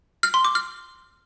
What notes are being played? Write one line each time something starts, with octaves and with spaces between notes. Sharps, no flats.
F6
C6
D6
F6